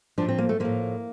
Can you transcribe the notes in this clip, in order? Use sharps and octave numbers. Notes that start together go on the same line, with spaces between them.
A2 F3 D4
C4
A#3
A3
A2 F3 A#3